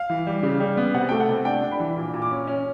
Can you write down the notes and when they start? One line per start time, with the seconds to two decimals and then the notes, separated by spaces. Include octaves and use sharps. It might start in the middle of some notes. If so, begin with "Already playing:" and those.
Already playing: F5
0.10 E3
0.27 G3
0.43 C#3
0.60 G3
0.77 B3
0.94 C3 F#5
1.09 A3 G5
1.20 F#5
1.29 C3
1.45 D4 G5
1.63 D4
1.71 B5
1.80 E3
1.97 A#2
2.14 A#2
2.22 D6
2.31 C#4
2.47 C#4